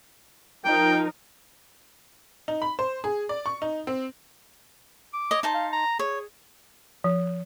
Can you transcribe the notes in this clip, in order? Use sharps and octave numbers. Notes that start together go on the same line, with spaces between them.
F3 D#4 A#4 G5
D#4
B5
C5
G#4
D5
C#6
D#4
C4
D6
C#5 D#5
D#4 C5 A5
F5
A#5
G#4 C#5
F3